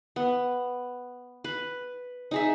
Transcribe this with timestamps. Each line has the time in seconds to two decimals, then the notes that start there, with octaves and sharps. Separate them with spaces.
0.16 B3
1.44 B4
2.31 D#4 G#4 E5